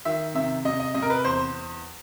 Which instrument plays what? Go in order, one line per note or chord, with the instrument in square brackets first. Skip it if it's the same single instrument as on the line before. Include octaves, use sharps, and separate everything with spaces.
[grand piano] D#3 E5
C3 E5
C3 D#5
D#5
C3 D#5
A#4
B4
E2 C5